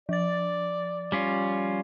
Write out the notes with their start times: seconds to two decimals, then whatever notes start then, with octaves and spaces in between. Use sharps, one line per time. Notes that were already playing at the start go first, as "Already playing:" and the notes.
0.09 F3 D5 A6
1.12 G3 C#4 F4